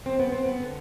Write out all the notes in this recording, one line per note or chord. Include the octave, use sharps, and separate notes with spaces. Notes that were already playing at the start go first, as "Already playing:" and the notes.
C4
B3
C4
B3
D3